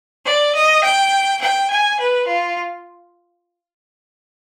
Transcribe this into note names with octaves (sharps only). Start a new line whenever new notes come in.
D5
D#5
G5
G5
G#5
B4
F4